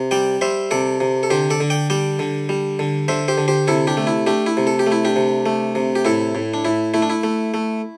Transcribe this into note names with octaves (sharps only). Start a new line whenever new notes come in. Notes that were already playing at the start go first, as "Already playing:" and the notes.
Already playing: C3
G3 D5 G5
G3 C5 E5
C3 A4 D5
C3
A4
D3 G4 C5
A4 D5
D3
D5 G5
G3 D5 G5
D3
G3
D3
D3 C5 E5
G4 C5
D3
G4 C5
C3 E4 A4
D4 G4
A3
E4
A3 D4 G4
E4
C3
A4
G4
A3
E4
D4 G4
C3
A3
C3
G4
A2 E4 A4
A2
D4
A2 E4
A3 E4
D4
E4
A3
A3